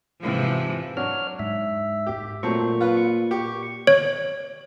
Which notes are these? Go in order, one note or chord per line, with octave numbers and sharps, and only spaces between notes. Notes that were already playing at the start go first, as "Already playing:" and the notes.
G#2 C3 E3 F3
F#3 D4 F#4 C#5 F6
G#2 E5
G4
A#2 F#3 A3 C4 C#6
F4 B4
G4 C#6
C#5